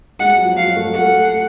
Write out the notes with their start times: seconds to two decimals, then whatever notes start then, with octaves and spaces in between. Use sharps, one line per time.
0.19 G#3 F#5
0.37 F#3
0.45 F3
0.57 F#3 F5
0.76 A3
0.94 A3 F#5